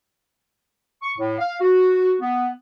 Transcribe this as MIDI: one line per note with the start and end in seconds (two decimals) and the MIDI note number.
1.02 1.13 85
1.18 1.36 45
1.39 1.57 77
1.61 2.14 66
2.21 2.50 59